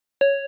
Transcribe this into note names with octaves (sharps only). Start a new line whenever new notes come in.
C#5